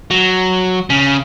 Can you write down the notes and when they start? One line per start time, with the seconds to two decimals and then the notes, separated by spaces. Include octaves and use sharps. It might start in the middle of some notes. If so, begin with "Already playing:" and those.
0.11 F#3
0.90 C#3